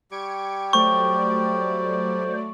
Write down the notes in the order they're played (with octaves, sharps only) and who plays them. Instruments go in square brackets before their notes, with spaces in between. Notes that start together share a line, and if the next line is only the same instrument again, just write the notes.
[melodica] G3 G4 [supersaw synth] C#6 G#6 D7
[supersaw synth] F#3 A3 D5 [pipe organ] C5 [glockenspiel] C#6